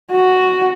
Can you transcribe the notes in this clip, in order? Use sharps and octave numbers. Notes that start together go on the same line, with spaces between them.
F#4